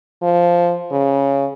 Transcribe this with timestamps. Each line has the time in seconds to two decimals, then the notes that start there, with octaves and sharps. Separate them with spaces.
0.23 F3
0.92 C#3